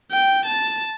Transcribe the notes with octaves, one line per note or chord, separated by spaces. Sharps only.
G5
A5